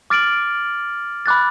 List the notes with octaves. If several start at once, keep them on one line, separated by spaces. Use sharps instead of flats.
D6 F6 A6 D7 F#7
B5 D6 F#6 A6